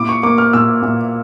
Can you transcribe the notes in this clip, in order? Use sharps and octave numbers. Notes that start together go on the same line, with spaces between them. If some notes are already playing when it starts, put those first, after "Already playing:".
Already playing: A#2 E4 D6
C#6
A#3 D6
F6
A#2 E6
A#2